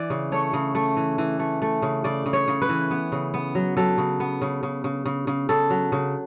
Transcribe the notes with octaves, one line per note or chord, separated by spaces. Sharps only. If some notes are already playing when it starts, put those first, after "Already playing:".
Already playing: E3 D5
C#3
A3 C#5
C#3
A3
E3
E3
A3
A3
C#3
C#3 D5
C#3
C#5
C#3
B4
E3
B3
C#3
B3
F#3
F#3 A4
C#3
B3
C#3
C#3
C#3
C#3
C#3
C#3 A4
F#3
C#3